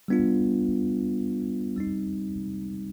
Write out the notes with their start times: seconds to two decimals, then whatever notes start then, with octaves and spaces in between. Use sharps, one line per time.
0.08 G3 B3 D4 F4
1.76 G3 C4 D#4